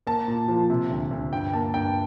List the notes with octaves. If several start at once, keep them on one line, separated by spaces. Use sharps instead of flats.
A#3 A5
A#2
F3
C3
D2
D2
G2 G5
A#3 A5
G2 G5